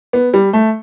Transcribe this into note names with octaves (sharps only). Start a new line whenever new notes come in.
B3
G3
A3